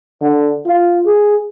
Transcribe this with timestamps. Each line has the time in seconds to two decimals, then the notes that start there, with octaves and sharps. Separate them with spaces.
0.22 D3
0.66 F4
1.06 G#4